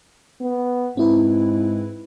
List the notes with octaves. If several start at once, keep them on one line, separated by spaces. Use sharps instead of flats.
B3
G#2 C4 E4 B4